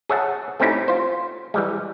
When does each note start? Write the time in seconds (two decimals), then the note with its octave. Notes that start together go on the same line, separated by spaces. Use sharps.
0.09 G#4 C#5 E5 F#5 A5
0.60 A3 C4 C#4 D#4 E4 G4
0.88 F4 C5
1.54 E3 G3 G#3